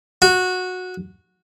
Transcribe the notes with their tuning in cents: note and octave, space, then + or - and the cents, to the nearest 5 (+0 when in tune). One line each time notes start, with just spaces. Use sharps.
F#4 -15